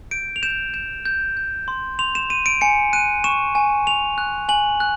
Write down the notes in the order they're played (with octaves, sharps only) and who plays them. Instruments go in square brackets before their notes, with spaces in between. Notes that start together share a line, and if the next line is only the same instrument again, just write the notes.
[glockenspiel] G6 D7
F7
G6 E7
G6 E7
G6
G6
C6
C6 F7
E7
C6 D#7
D7
G#5 C#7
F#6 D#7
C#6 E7
G#5
G#5 F7
F#6
G#5 F#7
F#6